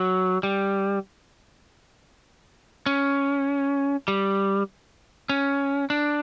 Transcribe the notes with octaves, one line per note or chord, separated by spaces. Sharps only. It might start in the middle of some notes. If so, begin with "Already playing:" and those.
Already playing: F#3
G3
C#4
G3
C#4
D4